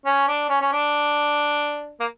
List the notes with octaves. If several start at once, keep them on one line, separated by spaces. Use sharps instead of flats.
C#4
D4
C#4
C#4
D4
A#3